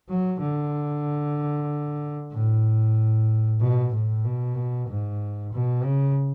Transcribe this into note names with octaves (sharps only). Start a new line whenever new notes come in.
F#3
D3
A2
B2
A2
B2
G#2
B2
C#3